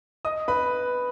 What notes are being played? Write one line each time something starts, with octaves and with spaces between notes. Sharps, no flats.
D#5 D#6
B4 B5